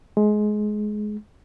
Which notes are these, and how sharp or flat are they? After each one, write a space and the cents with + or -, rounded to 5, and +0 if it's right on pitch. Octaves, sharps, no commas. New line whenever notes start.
G#3 +20